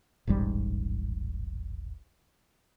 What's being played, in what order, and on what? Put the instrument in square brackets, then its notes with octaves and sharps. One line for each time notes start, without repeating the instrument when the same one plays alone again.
[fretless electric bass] D#1 A1 G#2 G3